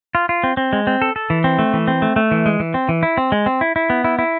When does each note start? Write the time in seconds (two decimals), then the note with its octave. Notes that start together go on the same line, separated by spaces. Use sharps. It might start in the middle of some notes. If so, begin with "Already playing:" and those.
0.15 F4
0.29 F4
0.44 C4
0.57 C4
0.73 G#3
0.87 C4
1.02 A4
1.16 A4
1.30 E3
1.44 C4
1.59 A3
1.74 E3
1.88 C4
2.02 A3
2.16 A3
2.31 E3
2.46 G#3
2.60 E3
2.74 C4
2.89 E3
3.03 E4
3.18 C4
3.32 G#3
3.46 C4
3.61 E4
3.76 E4
3.90 B3
4.04 E4
4.19 E4